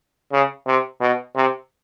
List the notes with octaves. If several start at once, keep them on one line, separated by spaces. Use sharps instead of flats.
C#3
C3
B2
C3